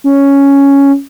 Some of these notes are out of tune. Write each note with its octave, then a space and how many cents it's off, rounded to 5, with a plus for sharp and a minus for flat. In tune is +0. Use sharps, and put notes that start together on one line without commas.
C#4 +5